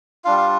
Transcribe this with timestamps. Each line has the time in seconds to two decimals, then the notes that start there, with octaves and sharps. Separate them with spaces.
0.25 G3 D4 F4 F5
0.38 F5